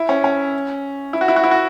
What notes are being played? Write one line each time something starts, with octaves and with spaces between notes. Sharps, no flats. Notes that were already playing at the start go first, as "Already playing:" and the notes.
Already playing: E4
C#4
C#4
E4
F#4
E4
F#4
E4
F#4